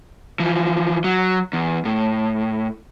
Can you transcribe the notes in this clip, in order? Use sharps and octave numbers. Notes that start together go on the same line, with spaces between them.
E3 F3
F#3
E2
A2